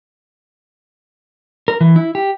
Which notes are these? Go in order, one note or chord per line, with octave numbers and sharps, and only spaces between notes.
A#4
E3
E4
G4